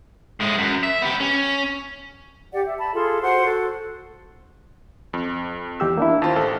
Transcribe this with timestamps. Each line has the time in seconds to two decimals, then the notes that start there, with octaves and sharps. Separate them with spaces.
0.40 A2 G#3
0.58 F#2
0.83 E5
1.02 B3 G4
1.20 C#4
2.52 G4 D5 F#5
2.64 E5
2.79 A5 B5
2.94 F4 G#4 A4 C6
3.22 F#4 C5 F#5 C6
3.45 F#4 A4
5.13 F2
5.80 E2 G4 E6
5.97 A#3 D4 E4
6.22 D#2 F4 C5 A5
6.36 A1 A4